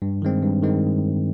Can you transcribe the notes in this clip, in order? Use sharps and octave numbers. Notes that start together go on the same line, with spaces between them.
G2
D#3 G#3 C4
G2
D#3 G#3 C4